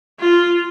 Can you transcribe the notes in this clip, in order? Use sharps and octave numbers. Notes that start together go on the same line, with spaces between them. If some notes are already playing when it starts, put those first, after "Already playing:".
F4